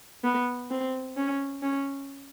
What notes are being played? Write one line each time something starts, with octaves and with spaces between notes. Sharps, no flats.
B3
C4
C#4
C#4